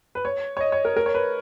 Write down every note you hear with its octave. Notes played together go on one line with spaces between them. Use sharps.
B4
C#5
C#5
D#5
C#5
A#4
A#4
C#5
B4